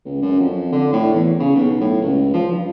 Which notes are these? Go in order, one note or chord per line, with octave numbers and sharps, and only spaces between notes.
C#2
F#2
F2
D3
A2
E2
C#3
B1
A2
C#2
F3
G2